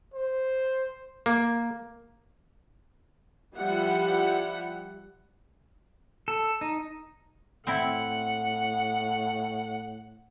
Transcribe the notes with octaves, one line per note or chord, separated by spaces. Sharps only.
C5
A#3
F3 G3 E4 F#5
A4
D#4
A2 C4 E4 F#5